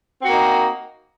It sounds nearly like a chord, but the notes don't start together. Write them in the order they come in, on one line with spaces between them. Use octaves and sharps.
C4 F#4 A#3 D#4